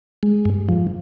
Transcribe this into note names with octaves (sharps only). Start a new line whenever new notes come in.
G#3
G2
F3